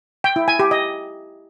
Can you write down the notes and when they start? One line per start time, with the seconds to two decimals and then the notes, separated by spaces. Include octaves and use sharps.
0.24 G5
0.36 E4
0.48 G#5
0.59 G4
0.71 D#5